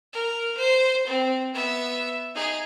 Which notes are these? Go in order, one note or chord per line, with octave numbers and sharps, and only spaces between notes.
A#4
C5
C4
B3 E5
D#4 G#4